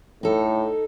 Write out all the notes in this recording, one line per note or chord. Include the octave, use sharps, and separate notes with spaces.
A2 D#4 A4